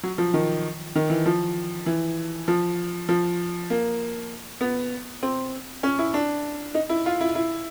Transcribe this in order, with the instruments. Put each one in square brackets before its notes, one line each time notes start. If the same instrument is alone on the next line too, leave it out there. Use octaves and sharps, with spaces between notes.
[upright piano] F#3
F3
D#3
D#3
E3
F3
E3
F3
F3
A#3
B3
C4
C#4
E4
D4
D#4
E4
F4
E4
E4